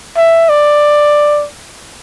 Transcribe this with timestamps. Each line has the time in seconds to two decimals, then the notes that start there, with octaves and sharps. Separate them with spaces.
0.17 E5
0.49 D5